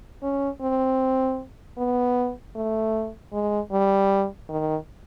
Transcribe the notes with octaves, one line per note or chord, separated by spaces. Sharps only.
C#4
C4
B3
A3
G#3
G3
D#3